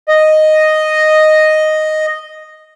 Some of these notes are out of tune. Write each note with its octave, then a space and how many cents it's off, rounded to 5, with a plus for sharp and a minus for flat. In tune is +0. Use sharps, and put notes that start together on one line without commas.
D#5 -5